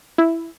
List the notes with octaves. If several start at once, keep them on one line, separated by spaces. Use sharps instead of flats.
E4